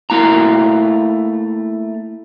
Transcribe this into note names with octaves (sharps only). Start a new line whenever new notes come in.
A3 A#3 E4 A#5